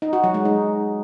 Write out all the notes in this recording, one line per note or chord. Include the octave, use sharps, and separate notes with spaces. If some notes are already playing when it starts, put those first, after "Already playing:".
D#4
F#4
F#3
G#3
D#4